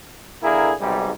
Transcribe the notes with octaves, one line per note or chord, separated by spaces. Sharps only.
D3 A#3 E4 G#4 A#4
B1 G#2 C3 G3